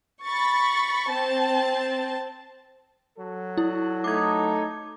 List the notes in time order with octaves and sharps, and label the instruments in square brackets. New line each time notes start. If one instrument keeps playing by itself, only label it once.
[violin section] B5 C#6 A6
C4 A5
[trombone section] F#3 A4
[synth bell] E4
[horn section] A3 D#4 [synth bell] D6 G#6